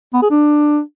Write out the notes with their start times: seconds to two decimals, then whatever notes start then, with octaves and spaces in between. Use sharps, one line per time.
0.13 B3
0.22 G#4
0.30 D4